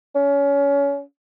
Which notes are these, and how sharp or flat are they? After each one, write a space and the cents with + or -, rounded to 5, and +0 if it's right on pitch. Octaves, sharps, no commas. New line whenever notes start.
C#4 +25